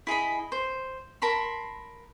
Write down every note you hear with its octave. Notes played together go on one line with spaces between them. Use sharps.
E4 G#4 D#5 B5
C5
A#4 A5 B5 C6